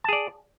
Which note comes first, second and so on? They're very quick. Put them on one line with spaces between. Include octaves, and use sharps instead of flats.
A5 G#4 D5